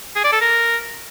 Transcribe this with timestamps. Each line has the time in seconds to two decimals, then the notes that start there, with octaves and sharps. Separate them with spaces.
0.16 G#4
0.24 D5
0.32 A4
0.41 A#4